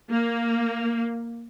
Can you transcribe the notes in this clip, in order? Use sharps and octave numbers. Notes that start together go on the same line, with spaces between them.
A#3